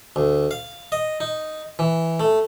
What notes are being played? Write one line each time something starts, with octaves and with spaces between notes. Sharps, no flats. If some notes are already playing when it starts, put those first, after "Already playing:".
D2
F5
D#5
D#4
E3
A3